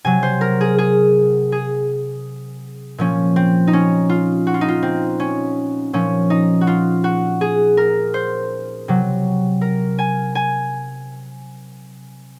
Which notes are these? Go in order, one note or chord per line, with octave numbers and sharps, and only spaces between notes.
C3 F#3 G#5
C5
A#4
G#4
G#4
G#4
A#2 F3 C#4
C4
D#4
C#4
F4
F#4
F4
D#4
F4
C4
C#4
A#2 F3 C#4
D#4
F#4
F4
F#4
G#4
A#4
C5
C3 F#3
A#4
G#5
G#5